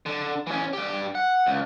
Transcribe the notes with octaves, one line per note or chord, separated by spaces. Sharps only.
D3
E3 C#4
G2 G4
F#5
C#2